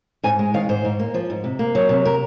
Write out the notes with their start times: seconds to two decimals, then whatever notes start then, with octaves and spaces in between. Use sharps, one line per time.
0.23 G#2 G#5
0.39 G#3
0.54 D#3 F5
0.69 G#2 C5
0.84 G#2
0.99 A#3
1.14 F3
1.30 G#2
1.44 C3
1.59 A#3
1.75 F#3
1.89 C3
2.05 A#4